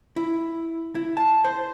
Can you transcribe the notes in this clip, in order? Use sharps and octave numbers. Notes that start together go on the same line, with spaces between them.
E4
E4
A5
C5